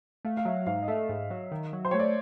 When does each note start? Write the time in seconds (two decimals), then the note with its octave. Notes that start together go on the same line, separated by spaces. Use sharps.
0.25 A3 F5
0.37 F5
0.45 F#3 E5
0.66 G#2 F5
0.82 D#5
0.88 A3 E5
1.09 G#2
1.31 F#3
1.52 D#3
1.73 F#3
1.85 C5
1.91 C#5
1.94 A3
1.99 D5